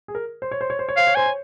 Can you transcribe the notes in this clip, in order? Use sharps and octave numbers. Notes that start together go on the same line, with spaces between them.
G#4
A#4
C5
C#5
C5
C#5
C5
C#5
C5 F5
C#5
C5 G#5
C#5